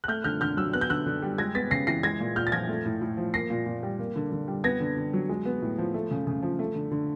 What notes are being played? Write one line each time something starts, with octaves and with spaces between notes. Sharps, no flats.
F#6
A3 F6 G6
D3 F6 G6
D3 F6 G6
F#3 E6 F#6
B3 F#6
G6
D3 E6 F#6
D3
G3
G#3 G#6 A#6
B3 A6 B6
C#3 A#6 C7
E3 A#6 C7
G#3 G#6 A#6
A#2
A#2 F6 G6
A6
F3 G#6 A#6
A3
A2
A2
F3
A#3 A#6 C7
A#2
A#2
G3
A#3
D3
D3
G3
B3 G#6 A#6
D3
D3
F#3
G#3
B3
A2
F3
A3
C#3
C#3
F3
A3
D3
D3